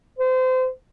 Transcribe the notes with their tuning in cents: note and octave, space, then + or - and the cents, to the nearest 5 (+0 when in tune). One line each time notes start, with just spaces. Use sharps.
C5 -30